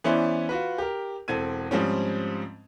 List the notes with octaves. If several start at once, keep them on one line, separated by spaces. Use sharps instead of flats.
E3 B3 C#4 E4 C5 D5
F4 F#4 B4
G4 A#4
E1 C4 A4 G#6 D#7
G#2 F3 G3 C4 C#4